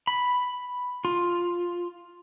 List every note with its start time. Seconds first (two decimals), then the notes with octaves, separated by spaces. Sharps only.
0.07 B5
1.05 F4